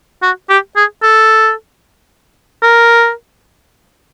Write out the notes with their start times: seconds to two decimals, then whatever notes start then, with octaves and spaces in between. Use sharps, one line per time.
0.22 F#4
0.49 G4
0.76 G#4
1.03 A4
2.63 A#4